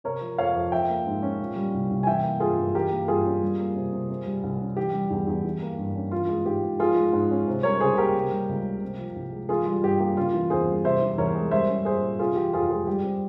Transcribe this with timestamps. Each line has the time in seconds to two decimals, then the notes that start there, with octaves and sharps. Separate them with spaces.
0.04 C3 A#4 C#5
0.21 F3
0.38 F2 C#5 F5
0.55 F2
0.72 F3 E5 G5
0.89 A#3
1.06 G#2
1.22 C#4
1.39 A#2
1.56 G3
1.74 C2
1.90 C2
2.03 G#5
2.07 E3 E5 G5
2.23 A#3
2.40 G2 F4 G#4
2.57 G2
2.74 E3 G4 A#4
2.92 A#3
3.08 G2 F4 G#4
3.25 C#4
3.42 G3
3.60 A#3
3.76 C3
3.93 C3
4.09 C3
4.26 G3
4.43 C2
4.61 C#4
4.77 E3 G4
4.93 G3
5.10 E2
5.27 E2
5.44 E3
5.62 A#3
5.78 G2
5.95 C#4
6.11 E3 F4
6.29 G#3
6.45 G#2 G4
6.63 G#2
6.79 F3 F4 G#4
6.96 G#3
7.13 G#2
7.31 C#4
7.48 C3
7.63 G3 A#4 C#5
7.80 C#2 G#4 C5
7.97 A#3 G4 A#4
8.14 C3
8.32 G3
8.49 C#2
8.65 A#3
8.83 C3
8.99 F3
9.16 C2
9.32 G#3
9.49 E3 F4 G#4
9.66 G3 F4
9.83 G2 G4
10.00 A#3 G4
10.17 C#3 F4
10.34 E3
10.50 E2 G#4 C5
10.67 G3
10.84 C3 C5 E5
11.01 E3
11.18 E2 A#4 C#5
11.35 G#3
11.51 G3 C5 E5
11.69 C#4
11.85 A#2 G#4 C5
12.03 A#2
12.19 C3 F4 G#4
12.36 E3 G4
12.53 F2 F4 G#4
12.70 G#3 F4 G#4
12.87 G3 G4
13.04 C4